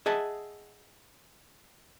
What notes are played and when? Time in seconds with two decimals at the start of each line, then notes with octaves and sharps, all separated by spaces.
0.06 G#4 D#5 E5 F#5 A5